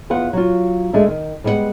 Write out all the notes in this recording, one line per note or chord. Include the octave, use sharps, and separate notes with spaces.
E2 B3 F4 F#5
F#3 F4
G#3 A3 D4 E5
D#3
G3 G#3 B3 E4 F#5